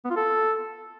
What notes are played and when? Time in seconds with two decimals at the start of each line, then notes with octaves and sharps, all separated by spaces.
0.05 B3
0.11 F4
0.16 A4